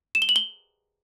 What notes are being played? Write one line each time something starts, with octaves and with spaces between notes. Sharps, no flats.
E7
G7
F#7
G7